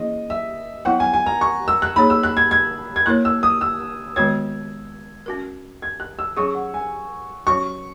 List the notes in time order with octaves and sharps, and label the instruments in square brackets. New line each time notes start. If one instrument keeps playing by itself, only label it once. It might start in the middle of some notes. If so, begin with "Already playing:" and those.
Already playing: [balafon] E3 A#3 C#4 E4 G#4 [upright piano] D#5
[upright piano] E5
[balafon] F#3 B3 E4 [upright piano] F#5
[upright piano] G#5
G#5
A#5
C#6
E6
F#6
[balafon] A#3 D#4 G#4 C#5 [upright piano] B5
[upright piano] E6
F#6
G#6
G#6
G#6
[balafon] A#3 E4 A#4 C#5 [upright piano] F#6
[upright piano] E6
D#6
E6
[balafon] D#3 G#3 B3 F#4 C#5 [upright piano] G#6
[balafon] C#4 F#4 A#4
[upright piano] G#6
F#6
E6
[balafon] F#3 C#4 G#4 [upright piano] C#6
[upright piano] F#5
G#5
[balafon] F#3 C#4 F#4 [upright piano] C#6